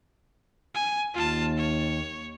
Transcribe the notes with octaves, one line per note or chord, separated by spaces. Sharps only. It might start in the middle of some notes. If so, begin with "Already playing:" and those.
G#5
D#2 F4 A5
C#5